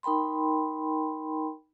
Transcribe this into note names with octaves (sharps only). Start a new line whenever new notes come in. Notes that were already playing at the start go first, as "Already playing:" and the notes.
D#4 A#4 G5 B5 C6